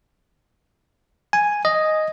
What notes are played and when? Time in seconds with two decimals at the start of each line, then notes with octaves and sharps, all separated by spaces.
1.33 G#5
1.65 D#5